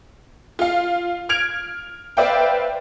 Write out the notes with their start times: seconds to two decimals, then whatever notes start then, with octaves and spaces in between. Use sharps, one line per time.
0.59 F4 F5
1.29 F6 G#6 D7 F7
2.17 B4 C5 D5 E5 F5 G5